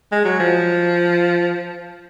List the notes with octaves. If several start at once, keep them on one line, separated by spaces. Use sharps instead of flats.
G#3
F#3
F3